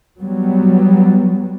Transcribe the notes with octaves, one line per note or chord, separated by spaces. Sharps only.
F#3 G3 B3